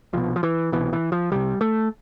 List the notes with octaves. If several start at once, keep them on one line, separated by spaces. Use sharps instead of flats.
C2 B2 F3
F3
E3
C2 B2 E3
E3
F3
C2 C3 G3
A3